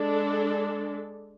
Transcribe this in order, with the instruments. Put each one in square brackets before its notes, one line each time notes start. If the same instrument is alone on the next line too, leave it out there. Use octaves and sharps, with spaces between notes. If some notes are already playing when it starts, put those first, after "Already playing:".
Already playing: [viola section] G#3 D4 A4